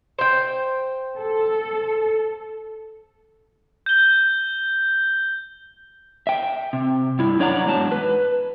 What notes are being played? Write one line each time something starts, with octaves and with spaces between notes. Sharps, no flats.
C5 G5
A4
G6 G7
E5 G5
C3
G2 E4
F#2 D4 C#5 D5 F#5 A#5
E2 G#2 F#3 G#5 A5
B4